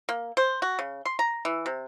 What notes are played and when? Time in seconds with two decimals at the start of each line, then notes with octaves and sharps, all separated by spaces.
0.09 A#3
0.37 C5
0.62 F#4
0.79 C#3
1.05 C6
1.19 A#5
1.45 E3
1.66 C3